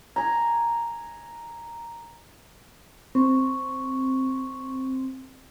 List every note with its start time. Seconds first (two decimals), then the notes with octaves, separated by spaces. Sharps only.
0.16 G#5 A#5
3.15 C4 C#6